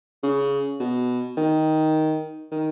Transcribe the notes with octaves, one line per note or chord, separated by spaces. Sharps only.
C#3
B2
D#3
D#3